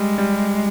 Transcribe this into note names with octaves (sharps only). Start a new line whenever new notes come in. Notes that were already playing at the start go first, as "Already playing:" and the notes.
Already playing: G3 G#3
G3